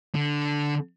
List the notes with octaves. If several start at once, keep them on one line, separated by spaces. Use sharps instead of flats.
D3